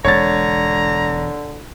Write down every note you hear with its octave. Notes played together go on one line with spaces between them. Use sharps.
E1 D3 G#3 C#5 A#5 A6